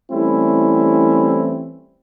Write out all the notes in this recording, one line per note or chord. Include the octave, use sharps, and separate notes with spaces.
E3 G3 A3 C4 C#4 E4